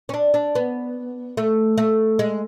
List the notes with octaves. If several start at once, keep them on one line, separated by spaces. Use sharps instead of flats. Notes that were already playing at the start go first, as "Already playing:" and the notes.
C#4
D4
D4
B3
A3
A3
G#3